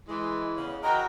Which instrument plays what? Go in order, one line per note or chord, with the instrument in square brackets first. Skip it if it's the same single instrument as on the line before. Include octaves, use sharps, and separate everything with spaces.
[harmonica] E3 [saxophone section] G#3
[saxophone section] E2 C#3
[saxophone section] E4 F#4 A#4 [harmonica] D#5 G5 [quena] A#5